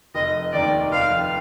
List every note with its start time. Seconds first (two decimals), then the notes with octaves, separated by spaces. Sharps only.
0.15 F1 D#5
0.53 D#2 D#3 D5
0.92 F1 F5